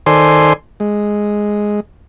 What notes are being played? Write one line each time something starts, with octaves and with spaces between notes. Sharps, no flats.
D#3 A4 C5 D5 G#5 C6
G#3